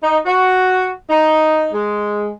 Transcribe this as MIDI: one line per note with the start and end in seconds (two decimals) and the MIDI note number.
0.03 0.18 63
0.25 0.89 66
1.10 1.68 63
1.73 2.28 56